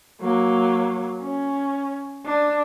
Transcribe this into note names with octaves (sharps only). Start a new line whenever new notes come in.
F#3 A#3
C#4
D4